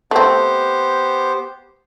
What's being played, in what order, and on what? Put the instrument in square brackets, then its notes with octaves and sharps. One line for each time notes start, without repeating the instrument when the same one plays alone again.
[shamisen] A3 C4 [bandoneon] B3 G4 C5